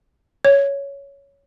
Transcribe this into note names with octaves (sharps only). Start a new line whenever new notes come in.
C#5